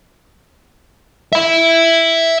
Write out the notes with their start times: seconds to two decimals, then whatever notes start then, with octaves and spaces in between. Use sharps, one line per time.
1.33 E5 B5